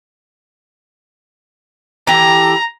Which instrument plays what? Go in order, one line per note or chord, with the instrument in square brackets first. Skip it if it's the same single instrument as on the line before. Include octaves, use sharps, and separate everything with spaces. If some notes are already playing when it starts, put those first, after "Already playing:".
[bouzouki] E3 G4 A4 [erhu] A#5